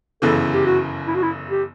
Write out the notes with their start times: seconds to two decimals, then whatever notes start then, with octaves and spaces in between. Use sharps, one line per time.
0.22 G1 F#2 C#3 E3 A4
0.53 G4
0.66 F#4
1.08 E4
1.15 F#4
1.22 E4
1.50 G4